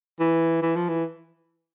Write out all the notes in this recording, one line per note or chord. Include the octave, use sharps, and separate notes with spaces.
E3
E3
F3
E3